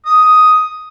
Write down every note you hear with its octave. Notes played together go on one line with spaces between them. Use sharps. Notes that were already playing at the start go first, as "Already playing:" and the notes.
D#6